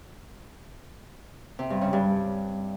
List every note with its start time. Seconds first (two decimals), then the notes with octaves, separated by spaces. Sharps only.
1.59 C3
1.70 G2
1.81 C#3
1.93 G2